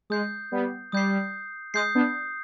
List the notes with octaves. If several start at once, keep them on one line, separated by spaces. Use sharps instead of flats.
G#3 D#6 G6 C7
G3 B3
G3 D#6 G6 C7
G#3 D#6 G6 C7
B3 D4